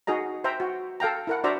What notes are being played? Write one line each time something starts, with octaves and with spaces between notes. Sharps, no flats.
D#4 F#4 G#4 D#5 A#5
C5 E5 G5 A#5
F#4
A4 F5 G5 A#5
E4 A#4 F#5
D4 F#4 C5 D5 E5 A#5